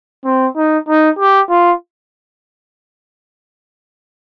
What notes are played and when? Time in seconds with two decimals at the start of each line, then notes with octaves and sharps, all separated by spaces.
0.25 C4
0.56 D#4
0.88 D#4
1.19 G4
1.50 F4